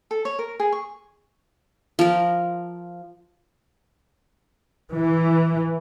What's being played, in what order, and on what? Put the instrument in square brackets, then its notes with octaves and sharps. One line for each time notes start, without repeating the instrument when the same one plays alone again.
[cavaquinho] A4
C#5
A#4
G#4
C#6
[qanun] F3 A#4
[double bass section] E3